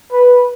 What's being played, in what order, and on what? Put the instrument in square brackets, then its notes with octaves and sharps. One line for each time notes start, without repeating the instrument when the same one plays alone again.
[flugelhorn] B4